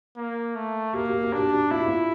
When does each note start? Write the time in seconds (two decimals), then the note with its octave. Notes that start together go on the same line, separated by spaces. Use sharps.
0.17 A#3
0.55 A3
0.93 A#3 G4
1.09 G4
1.23 G4
1.33 D4
1.38 G4
1.53 G4
1.71 E4 F4
1.80 G4
1.88 F4